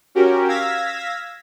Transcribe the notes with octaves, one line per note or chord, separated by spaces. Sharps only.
C#4 F#4 G4 A#4
F5 E6 G#6 A#6 B6